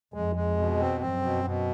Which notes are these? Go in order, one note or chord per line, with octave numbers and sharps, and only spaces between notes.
F2 G#3
G#3
B2
C4
F#2 C4
B2
B2